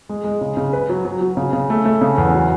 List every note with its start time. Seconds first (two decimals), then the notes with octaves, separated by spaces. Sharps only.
0.09 G#3
0.24 G#3
0.41 C#3
0.57 C#3
0.73 B4
0.89 F#3
1.05 F#3
1.21 F#3
1.37 C#3
1.53 C#3
1.70 A3
1.85 A3
2.01 C#3
2.18 E2
2.34 F#3